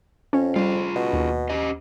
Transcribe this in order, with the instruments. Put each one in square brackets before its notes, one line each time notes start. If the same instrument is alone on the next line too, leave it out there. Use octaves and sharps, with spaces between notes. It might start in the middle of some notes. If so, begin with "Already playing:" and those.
[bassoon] F2 [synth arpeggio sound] C#4
[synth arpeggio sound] G3 [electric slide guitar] F4 G#4
[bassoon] B2
[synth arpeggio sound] D#2
[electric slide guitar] C#4 G4 D#5